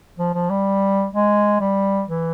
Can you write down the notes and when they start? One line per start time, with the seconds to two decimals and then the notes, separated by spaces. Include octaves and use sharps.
0.19 F3
0.34 F3
0.50 G3
1.13 G#3
1.60 G3
2.08 E3